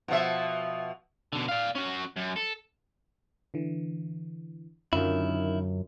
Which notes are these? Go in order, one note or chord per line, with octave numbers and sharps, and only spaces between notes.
B2 F3 E5
B2 D3
D5 F5
C#4 F#4
F#2
A4
D3 E3
F#2 D3 D#3 E4 F4